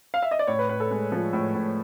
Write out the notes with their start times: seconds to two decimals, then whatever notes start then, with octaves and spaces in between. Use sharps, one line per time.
0.14 F5
0.22 E5
0.31 D#5
0.39 D5
0.47 A2 C#5
0.59 B4
0.69 A2 B4
0.80 A4
0.91 G#3
1.12 F3
1.33 A2
1.54 A2